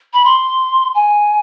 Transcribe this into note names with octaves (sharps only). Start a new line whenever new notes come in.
B5
C6
G#5